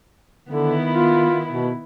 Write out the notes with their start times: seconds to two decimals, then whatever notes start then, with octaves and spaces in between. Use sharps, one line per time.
0.48 D3 D#3 B3 E4
0.90 F4
1.51 B2